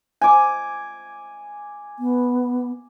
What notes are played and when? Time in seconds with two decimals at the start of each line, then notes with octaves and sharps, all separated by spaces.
0.21 G#5 D6
1.99 B3